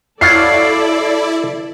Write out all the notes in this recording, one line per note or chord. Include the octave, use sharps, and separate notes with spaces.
F#3 E4 F4 A4 C#5 D5 C7